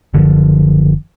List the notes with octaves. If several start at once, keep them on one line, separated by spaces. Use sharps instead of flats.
F#1 F#2 D3 F3